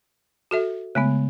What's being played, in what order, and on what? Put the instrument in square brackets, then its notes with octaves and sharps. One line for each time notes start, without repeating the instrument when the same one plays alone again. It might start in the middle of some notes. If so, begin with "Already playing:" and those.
[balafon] F#4 A4 E5
[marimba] C#3 G#3 B3 [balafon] A3